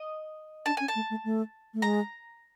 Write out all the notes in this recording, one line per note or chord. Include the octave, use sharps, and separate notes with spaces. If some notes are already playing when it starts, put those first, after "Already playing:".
Already playing: D#5
D4 A5
C#4 G#5
A5
A3
A3
A3
A3
G#3 A#5